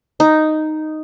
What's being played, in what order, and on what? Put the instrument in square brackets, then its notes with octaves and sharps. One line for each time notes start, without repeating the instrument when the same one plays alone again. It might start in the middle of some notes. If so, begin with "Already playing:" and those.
[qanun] D#4